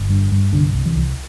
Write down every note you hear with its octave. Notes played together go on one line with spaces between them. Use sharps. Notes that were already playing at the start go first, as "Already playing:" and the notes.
Already playing: G1
G2
G2
C2 D3
C2
E3
C2